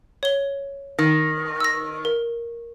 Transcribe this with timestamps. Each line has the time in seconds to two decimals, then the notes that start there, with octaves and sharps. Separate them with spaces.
0.23 C#5 G7
0.99 D#3
1.60 E6 A#6
2.05 A#4